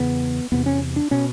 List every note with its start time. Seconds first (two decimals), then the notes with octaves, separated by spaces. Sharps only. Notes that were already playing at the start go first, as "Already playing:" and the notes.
Already playing: E2 C#3 B3
0.52 E2 C3 B3
0.66 C#4
0.96 D4
1.11 B2 C#4